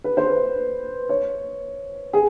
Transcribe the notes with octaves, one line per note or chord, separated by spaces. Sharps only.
B4
C5
B4
C#5
G#4